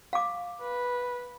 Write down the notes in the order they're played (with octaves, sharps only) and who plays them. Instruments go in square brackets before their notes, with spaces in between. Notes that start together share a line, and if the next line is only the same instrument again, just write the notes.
[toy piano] F5 D6
[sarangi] B4